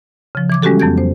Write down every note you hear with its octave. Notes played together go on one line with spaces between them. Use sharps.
C#3 F3
E3 D6 G#6
G3 G#3 C#4 F#4 G4 A4
F2 F#3 B3 G6 G#6
C5